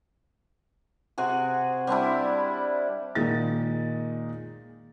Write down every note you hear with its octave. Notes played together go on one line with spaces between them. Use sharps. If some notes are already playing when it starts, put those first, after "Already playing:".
C3 F#4 G#4
G3 C4 D4 E4
A#2 D#3 G#3 D#4 A6